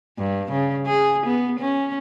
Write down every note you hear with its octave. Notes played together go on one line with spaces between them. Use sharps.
G2
C#3
G#4
B3
C#4